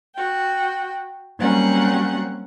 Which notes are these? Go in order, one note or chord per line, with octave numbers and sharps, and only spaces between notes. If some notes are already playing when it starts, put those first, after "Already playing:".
F#4 G5
F#3 G3 A#3 C4 C#4 F#5